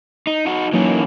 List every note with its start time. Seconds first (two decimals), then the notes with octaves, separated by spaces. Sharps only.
0.27 D#4
0.47 D#4 F#4
0.73 E3 F#3 A#3 C#4 D#4